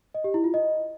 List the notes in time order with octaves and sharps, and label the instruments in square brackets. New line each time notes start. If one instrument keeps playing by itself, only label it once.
[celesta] D#5
G4
E4
F4
D#5